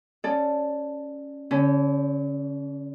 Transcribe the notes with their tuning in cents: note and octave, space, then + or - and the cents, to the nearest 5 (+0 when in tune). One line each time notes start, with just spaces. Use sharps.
C#4 +0 A4 +0 D5 +10
D3 -40 C#4 +0